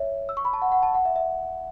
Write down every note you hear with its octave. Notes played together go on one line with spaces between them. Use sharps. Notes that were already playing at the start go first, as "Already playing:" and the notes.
Already playing: C#5 E5
E6
C#6
B5
A5
F#5
F#5
A5
F#5
E5
E5